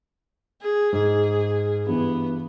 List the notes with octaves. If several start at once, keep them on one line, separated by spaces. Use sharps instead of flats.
G#4
G#2 G#4
G2 E3 B3